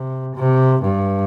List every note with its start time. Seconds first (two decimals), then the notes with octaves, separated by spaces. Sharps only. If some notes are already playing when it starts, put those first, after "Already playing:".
Already playing: C3
0.36 C3
0.83 G2